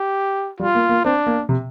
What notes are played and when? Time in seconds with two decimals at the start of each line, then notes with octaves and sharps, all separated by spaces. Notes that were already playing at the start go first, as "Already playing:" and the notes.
Already playing: G4
0.60 G3 F4
0.75 A#3
0.89 A#3
1.05 C4 D4
1.27 A#3
1.49 C3